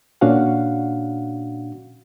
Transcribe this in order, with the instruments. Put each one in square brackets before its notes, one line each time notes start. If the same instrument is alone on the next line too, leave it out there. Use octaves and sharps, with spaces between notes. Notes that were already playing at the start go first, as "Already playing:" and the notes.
[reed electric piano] A#2 C#4 D4 F#4 F5 F#5